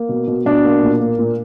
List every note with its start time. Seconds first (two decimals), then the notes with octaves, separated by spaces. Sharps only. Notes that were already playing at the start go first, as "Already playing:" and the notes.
Already playing: A#3
0.09 B2
0.27 B2
0.45 B2 D4
0.64 A#3
0.83 A#2
1.00 A#3
1.18 A#2